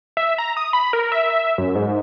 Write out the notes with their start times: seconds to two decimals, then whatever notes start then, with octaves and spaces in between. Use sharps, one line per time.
0.17 E5
0.38 A#5
0.57 D#6
0.73 B5
0.93 A#4
1.12 E5
1.30 E5
1.58 F#2
1.76 G#2